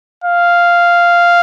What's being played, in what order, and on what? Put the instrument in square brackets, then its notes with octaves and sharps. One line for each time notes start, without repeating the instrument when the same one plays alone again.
[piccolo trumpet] F5